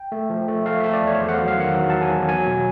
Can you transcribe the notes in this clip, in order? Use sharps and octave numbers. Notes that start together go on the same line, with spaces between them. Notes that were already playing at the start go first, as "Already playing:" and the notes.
Already playing: G5
A3
F3
A3
A3 F5
A3 E5
D5
E2 C#5
E2 C5
F#5
F#3 F5
F5
D#3 F#5
F#3
F#3 A5
G#5
E2
F#3 G#5
B2